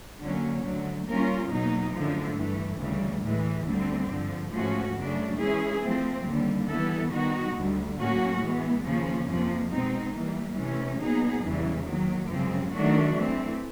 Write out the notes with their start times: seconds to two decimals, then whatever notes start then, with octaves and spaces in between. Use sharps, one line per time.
0.22 D3 F#3 A#3 C#4
0.65 D2 D3 F#3
1.08 G3 A#3 C#4 F4 A#4
1.51 E2 B2 F#3 A#3 D#4
1.94 F#2 D3 F3 A3
2.38 G2 E3 A3
2.81 D2 C#3 E3 G3
3.24 A2 E3 G#3
3.67 D2 D3 G3 C4
4.11 G2 D3 F3
4.53 G#2 F3 A3 C#4 F#4
4.97 F#2 C#3 F#3 A3 D4
5.39 E3 G#3 C#4 E4 G#4
5.83 F3 A3 C4
6.26 D#2 D3 G3
6.69 E3 G3 B3 E4 A4
7.12 D#3 G3 B3 D#4 F#4
7.55 D2 D3 G3
7.98 A2 F#3 A#3 C#4 F#4
8.41 E3 G#3 B3
8.85 D#2 C#3 F3 A#3 C#4
9.28 F2 C3 F3 A#3
9.71 B2 G#3 C4 D#4
10.14 E3 G3 A#3
10.57 C3 E3 A3 C#4
11.00 A#2 F#3 B3 D#4 G#4
11.43 E2 C#3 E3 G3
11.87 D#3 F#3 A#3
12.30 F#2 C#3 F3 G#3 C4
12.73 D#3 F#3 A3 D4 F#4
13.16 E3 A3 C4